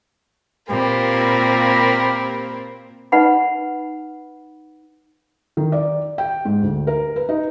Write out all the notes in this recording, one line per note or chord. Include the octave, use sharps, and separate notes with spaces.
A#2 A#3 C4 G4 A#4 B5
D#4 B4 F#5 B5
D#3
D5
G5
G#2
D2
A#4
B4
D#4